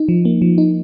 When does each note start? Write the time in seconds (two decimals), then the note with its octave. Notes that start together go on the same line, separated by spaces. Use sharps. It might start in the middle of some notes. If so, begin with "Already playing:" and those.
Already playing: D#4
0.09 F3
0.25 A#3
0.42 F3
0.58 D#4